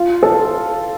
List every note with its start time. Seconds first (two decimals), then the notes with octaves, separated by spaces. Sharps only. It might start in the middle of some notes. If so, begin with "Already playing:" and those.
Already playing: F4
0.23 A4